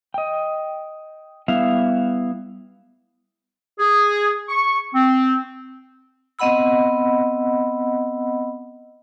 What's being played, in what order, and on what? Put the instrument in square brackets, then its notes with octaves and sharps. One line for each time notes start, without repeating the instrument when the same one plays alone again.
[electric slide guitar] D#5 G5
G3 B3 E4 E5 F5
[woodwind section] G#4
C#6
C4
[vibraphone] B3 C4 D#5 F#5 B5 E6